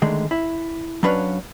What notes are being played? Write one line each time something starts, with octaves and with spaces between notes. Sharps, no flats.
D3 D#3 G#3 A3
E4
F#3 C#4 D4 B4 C#5 F5